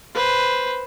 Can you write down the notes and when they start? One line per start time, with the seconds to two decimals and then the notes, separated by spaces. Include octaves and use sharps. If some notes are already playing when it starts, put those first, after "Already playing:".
0.14 B4 C5